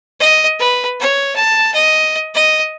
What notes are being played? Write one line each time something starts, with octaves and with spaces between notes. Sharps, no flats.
D#5
B4
C#5
A5
D#5
D#5